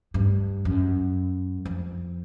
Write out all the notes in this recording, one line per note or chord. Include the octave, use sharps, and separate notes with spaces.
G2
F#2
F2